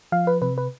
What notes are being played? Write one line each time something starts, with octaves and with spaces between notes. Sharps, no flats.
F3 F5
B4
C3 B4
B4